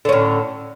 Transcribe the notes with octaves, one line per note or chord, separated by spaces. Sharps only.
A2 D3 C#4